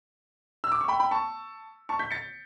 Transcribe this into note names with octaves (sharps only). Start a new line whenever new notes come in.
E6
D6
C#6
G5 B5
G5 B5
A5 C#6
A5 C#6
G6 B6
A6 C#7